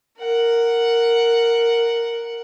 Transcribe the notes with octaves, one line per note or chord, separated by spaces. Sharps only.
A#4 F#5